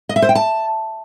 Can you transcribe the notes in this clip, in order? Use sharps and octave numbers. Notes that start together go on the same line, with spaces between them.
D#5
E5
C5
G5
A5